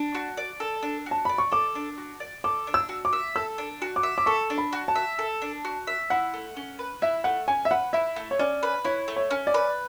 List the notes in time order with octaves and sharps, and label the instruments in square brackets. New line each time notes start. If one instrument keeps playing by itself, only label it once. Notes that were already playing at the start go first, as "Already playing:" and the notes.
Already playing: [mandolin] D4
F#4
D5
A4
D4
F#4
[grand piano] A5
[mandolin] D5 [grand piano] B5
[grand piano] C#6
[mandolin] A4 [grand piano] D6
[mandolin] D4
F#4
D5
[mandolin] A4 [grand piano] D6
[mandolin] D4
[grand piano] E6
[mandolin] F#4
[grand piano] D6
[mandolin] E5
[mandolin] A4 [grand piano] E6
[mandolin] D4
F#4
[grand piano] D6
[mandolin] E5
[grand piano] D6
[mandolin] A4 [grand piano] C#6
[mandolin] D4
[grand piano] B5
[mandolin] F#4
[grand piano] A5
[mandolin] E5
A4
D4
F#4
E5
[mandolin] E4 [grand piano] F#5
[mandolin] A3
C#4
B4
[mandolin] E4 [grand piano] E5
[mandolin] A3 [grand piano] F#5
[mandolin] C#4 [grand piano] G#5
[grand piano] E5
[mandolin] B4 [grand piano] F#5
[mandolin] E4 [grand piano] E5
[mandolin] A3
[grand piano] C#5
[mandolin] C#4 [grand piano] D5
[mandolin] B4
[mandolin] E4 [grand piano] C#5
[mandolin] A3
[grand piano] C#5
[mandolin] C#4
[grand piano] D5
[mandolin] B4